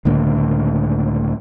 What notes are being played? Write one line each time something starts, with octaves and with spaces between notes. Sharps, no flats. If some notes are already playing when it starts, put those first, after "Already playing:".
C#2 A2 D3 A#3